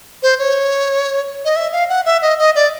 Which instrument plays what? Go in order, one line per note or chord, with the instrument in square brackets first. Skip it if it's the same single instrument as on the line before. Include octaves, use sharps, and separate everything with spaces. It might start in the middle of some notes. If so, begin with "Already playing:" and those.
[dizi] C5
C#5
D#5
E5
F5
F#5
E5
D#5
D#5
D5